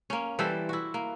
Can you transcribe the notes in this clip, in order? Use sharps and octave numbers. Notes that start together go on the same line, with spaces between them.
A#3 C#4
E3 G3 A4 C5
E4 F#4
A#3